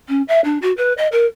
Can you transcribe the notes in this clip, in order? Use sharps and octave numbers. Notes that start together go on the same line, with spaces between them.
C#4
E5
D4
F#4
B4
D#5
A#4